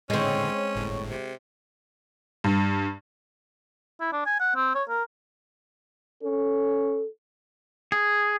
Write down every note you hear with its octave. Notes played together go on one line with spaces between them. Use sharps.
A2 D3 G#3 C4 C#4 C#5 C#6
G1 A2
C3
G2
E4
D4
G#5
F#5
C4
C#5
A#4
C#4 A4
G#4